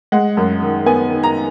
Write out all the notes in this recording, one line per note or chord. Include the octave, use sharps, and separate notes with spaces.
G#3 F#5
F#2
D#3
B3 G#5
D#3
A#5